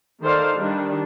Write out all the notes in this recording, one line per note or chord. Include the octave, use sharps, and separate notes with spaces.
D#3 A4 C5 D5 F5
D#3 G3 D4